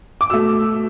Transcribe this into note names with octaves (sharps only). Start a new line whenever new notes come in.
D6
B2 A3 E6